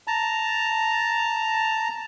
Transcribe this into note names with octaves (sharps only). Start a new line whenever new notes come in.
A5 A#5